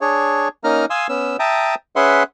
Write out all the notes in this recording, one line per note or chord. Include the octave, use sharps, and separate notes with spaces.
D4 G#4 C#5
A#3 C#4 D#4 A#5 F6
F5 G#5 C6 D#6 E6
B3 C#4 E6
E5 G5 A5 A#5 D#6
C#4 G#4 B4 E5 F#5 C6